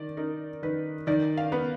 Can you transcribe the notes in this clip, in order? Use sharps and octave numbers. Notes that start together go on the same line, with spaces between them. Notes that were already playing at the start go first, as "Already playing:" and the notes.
Already playing: D#3 D5
D#4 A#4
D#3 B4
D#3 D5
F5
B3